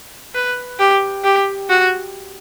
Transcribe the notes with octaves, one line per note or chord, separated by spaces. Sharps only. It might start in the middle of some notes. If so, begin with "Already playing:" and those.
B4
G4
G4
F#4